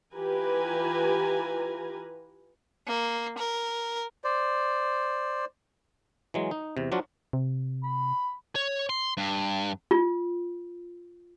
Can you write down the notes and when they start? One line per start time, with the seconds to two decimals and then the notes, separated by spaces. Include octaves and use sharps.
0.15 E3 F4 G4 B4 G#5 A#5
2.87 A#3
3.38 A#4
4.24 C5 D5
6.34 E3 F#3 G#3
6.51 D#4
6.77 E2 C3
6.92 F3 F#3 D4 F4 F#4
7.33 C3
7.84 B5
8.55 C#5
8.89 C6
9.17 G2
9.91 F4